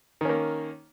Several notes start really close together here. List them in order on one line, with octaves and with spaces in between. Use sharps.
D#3 C#4 A#3